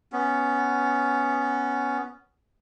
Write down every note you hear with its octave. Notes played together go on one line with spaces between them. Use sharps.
B3 C#4